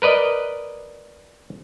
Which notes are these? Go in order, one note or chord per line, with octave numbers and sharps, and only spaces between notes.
A#4 B4 D5 D#5